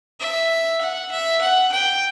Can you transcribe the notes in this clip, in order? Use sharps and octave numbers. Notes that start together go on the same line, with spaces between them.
E5
F#5
E5
F#5
G5